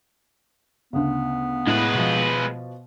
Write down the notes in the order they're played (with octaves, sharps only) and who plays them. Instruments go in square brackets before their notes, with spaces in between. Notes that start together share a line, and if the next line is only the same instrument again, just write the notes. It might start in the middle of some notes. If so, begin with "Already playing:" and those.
[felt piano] D2 C#3 [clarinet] B3
[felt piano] A2 [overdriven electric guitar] G#3 B4
[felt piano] B2 F3